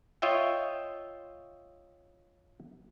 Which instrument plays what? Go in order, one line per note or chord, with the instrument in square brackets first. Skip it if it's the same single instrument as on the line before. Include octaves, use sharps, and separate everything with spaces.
[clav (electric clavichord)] F4 C#5 D#5 E5 G5